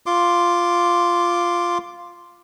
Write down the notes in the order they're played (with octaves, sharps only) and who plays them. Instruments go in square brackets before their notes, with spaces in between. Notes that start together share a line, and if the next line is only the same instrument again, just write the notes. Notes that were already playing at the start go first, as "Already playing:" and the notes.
[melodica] F4 C6 D6